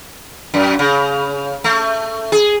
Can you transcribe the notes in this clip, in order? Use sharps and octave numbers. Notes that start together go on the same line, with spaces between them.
F#2
C#3
A3
G#4